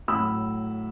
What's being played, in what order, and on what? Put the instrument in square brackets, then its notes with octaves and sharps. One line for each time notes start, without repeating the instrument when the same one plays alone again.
[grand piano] A2 F#3 B5 E6